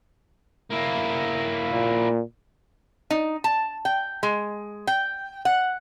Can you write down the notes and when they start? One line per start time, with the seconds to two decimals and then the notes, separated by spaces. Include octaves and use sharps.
0.70 A#3 E4
1.73 A#2
3.10 D#4
3.44 A5
3.85 G5
4.23 G#3
4.87 G5
5.45 F#5